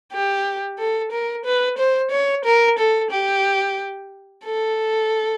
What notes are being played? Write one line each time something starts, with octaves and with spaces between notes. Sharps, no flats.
G4
A4
A#4
B4
C5
C#5
A#4
A4
G4
A4